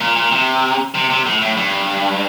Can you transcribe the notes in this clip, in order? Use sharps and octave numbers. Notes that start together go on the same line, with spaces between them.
A#2
A#2
C3
C3
C3
A2
A2
G2